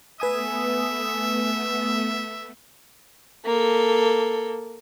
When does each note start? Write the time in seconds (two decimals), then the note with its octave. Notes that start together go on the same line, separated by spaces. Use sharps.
0.20 A3 B3 B4 E5 G#5 D#6
3.45 A#3 A4